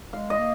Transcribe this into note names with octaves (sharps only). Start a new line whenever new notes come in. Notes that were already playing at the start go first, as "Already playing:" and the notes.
G#3 F5
D#5
A#3